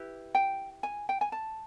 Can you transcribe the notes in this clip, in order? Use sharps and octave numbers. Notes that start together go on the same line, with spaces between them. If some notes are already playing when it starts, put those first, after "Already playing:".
Already playing: E4 G4 B4
G5
G#5
G5
G#5
A5